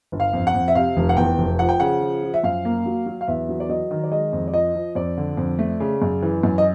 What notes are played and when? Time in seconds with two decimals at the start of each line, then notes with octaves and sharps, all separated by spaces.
0.12 G1
0.20 F5
0.33 F2
0.47 F#5
0.54 F2
0.68 E5
0.75 C3 F5
0.97 F1
1.09 F#5
1.17 E2 G5
1.38 F1
1.59 F3 F#5
1.69 G5
1.80 C#3 F#5
2.01 F3
2.23 F3
2.34 E5
2.43 F#2 F5
2.65 A#3
2.86 F#3
3.06 F#3
3.21 F5
3.28 E2 E5
3.49 F#3
3.60 D5
3.69 F#3 D#5
3.91 D#3
4.04 D5
4.11 G#3 D#5
4.33 F2
4.48 D5
4.54 F3 D#5
4.75 F3
4.95 F2 D5
5.18 D3
5.37 F2
5.59 A3
5.80 C#3
6.02 F#2
6.22 E3
6.43 F#2
6.58 D#5